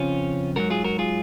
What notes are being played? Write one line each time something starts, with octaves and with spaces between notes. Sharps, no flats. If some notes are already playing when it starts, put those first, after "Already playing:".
Already playing: F2 C#3 F3 C#4 F4
G#2 F#3 F#4 A#4
F4 G#4
F#4 A#4
F4 G#4